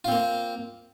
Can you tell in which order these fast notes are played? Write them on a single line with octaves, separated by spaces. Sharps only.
F4 C4 A#3